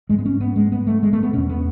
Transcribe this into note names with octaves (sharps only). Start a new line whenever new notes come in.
G#2 G#3
B3
C#4
B3
G#3
B3
A3
G#3
A3
B3
E2 B2 C#4
B3